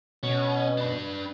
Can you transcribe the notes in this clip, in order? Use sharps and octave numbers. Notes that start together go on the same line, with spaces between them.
B2 C#4
D4 B4